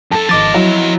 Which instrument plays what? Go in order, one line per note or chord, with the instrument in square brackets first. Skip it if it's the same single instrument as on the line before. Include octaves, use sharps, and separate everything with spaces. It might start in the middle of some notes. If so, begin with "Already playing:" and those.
[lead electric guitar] F#2 A4 [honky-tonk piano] A5
[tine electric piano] G#1 D6 A6 [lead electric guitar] F3 D#5
[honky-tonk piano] F#3 [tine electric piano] E4